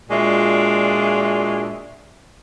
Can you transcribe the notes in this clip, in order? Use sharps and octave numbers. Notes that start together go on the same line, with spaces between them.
A#2 G#3 D4 F4 F#4 E5